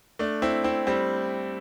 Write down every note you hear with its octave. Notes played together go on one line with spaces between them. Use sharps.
A3 D4
C4 E4
C4 E4
G3 C4